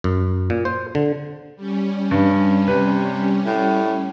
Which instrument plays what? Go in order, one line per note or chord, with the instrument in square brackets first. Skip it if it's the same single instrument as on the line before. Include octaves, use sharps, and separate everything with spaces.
[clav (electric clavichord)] F#2
A#2
C5
D3
[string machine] G3 C#4
[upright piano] G2
[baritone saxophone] C3 [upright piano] B4
[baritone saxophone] A2